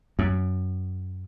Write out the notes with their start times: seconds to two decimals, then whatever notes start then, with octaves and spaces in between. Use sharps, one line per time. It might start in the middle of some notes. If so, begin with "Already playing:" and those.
0.19 F#2